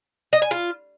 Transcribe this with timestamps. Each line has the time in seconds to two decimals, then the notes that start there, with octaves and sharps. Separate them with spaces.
0.33 D#5
0.42 G#5
0.51 F4